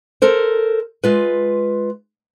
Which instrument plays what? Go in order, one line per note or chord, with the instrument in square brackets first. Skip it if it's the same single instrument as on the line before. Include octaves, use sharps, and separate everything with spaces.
[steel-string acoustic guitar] A4 A#4 C5
G#3 F4 B4